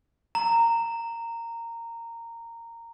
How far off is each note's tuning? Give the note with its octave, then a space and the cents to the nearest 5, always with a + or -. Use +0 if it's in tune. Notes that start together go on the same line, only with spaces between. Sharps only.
A#5 -15